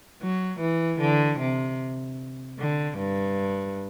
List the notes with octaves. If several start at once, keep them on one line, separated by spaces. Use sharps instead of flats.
F#3
E3
D3
C3
D3
G2